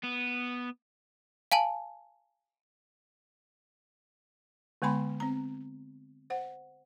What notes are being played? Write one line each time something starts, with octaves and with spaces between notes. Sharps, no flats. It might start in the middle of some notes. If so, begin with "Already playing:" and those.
B3
F5 G#5 A5 F#7
D3 G#3 B3 G#5 B5 C6
C4 A#5
C5 F#5